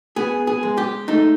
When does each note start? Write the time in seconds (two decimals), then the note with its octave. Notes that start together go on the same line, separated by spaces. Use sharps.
0.16 B3 G#4
0.47 G#4
0.63 G#3
0.78 G4
1.08 A3 D#4